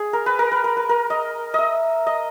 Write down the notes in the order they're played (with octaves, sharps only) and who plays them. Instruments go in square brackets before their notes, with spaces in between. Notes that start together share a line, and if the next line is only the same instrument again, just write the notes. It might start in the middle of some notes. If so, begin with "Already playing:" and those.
Already playing: [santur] G#4
A#4
B4
A#4
B4
A#4
B4
A#4
D#5
D#5 E5
D#5